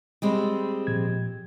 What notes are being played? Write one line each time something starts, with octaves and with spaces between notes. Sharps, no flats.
G3 G#3 C4
A#2 F3 G#6